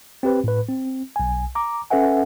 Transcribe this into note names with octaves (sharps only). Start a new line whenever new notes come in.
C4 G4 B4
A2 B4
C4
B1 G#5
A#5 D6
C#4 A4 B4 E5 F#5 G#5